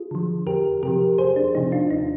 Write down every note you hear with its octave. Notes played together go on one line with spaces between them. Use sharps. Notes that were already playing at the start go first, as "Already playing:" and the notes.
Already playing: F4 G#4
D3 F3
F2 G4 A#4
C3 F3 G4 A#4
F2 G#4 C5
D4
C3 F3 D#4
D4 F4
D#2 D#4